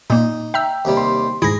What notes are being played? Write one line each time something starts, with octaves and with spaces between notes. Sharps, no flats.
A#2 A#3 D#4
E5 G5 A#5 E6
D#2 C3 G3
C6
D#2 G#2 E4 G#4 A#6